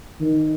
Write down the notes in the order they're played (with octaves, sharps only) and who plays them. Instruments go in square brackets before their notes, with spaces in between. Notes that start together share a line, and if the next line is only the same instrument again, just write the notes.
[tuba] D#3